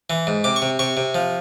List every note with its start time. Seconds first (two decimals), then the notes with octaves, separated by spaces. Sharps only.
0.10 E3
0.27 G#2
0.44 C3 D6
0.56 C#6
0.62 C3
0.79 C3 C#6
0.97 C3
1.15 F3